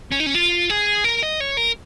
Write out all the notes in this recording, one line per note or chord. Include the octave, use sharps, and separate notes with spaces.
C#4
D#4
C#4
F4
G#4
A#4
D#5
C#5
A#4